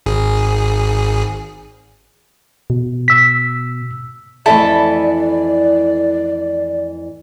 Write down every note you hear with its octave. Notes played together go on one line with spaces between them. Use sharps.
G#1 G#4
B2
E6 B6
F2 E3 A3 E4 A4 D5 B5